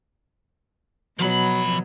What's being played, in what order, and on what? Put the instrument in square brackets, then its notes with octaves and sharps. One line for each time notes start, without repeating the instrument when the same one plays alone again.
[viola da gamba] B2 F#3 [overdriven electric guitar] F3 B5